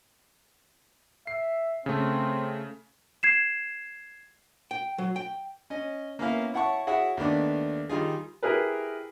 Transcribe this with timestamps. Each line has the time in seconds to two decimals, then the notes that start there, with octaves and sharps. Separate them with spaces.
1.27 E5 C7
1.86 C#3 A3 C4
3.23 G#6 C7 E7
4.71 G5
4.98 F#3
5.16 G5
5.70 C#4 D#5
6.19 A#3 B3 C#4 E4 A#4 F5
6.54 E4 C#5 F#5 A5 C#6
6.87 E4 F#4 G#4 C#5 E5 F#5
7.17 D#2 A3 B3 D4 D6
7.89 D#3 G3 D#4 F4 G#4
8.43 E4 G4 G#4 A#4 B4